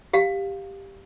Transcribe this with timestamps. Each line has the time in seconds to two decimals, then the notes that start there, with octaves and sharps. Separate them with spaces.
0.13 G4 F5